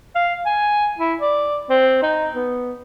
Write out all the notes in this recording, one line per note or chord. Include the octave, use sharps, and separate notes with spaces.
F5
G#5
E4
D5
C4
D#4
B3